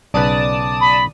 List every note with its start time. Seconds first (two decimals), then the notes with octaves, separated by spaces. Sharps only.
0.14 B1 C#3 B4 D5 A5 D#6
0.81 B5